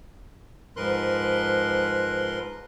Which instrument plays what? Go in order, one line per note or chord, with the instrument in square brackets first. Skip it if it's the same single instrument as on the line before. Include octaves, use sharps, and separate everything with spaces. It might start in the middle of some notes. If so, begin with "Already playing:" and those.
[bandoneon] G#2 F3 A#4 B4 C6 F#6